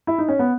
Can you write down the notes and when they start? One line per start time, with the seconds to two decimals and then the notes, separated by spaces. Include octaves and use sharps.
0.07 E4
0.18 D#4
0.28 C#4
0.39 B3